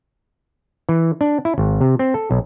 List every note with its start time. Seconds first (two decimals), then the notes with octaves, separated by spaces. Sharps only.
0.89 E3
1.21 D4
1.45 E4
1.58 G#1
1.81 C3
1.99 C4
2.14 A4
2.31 B1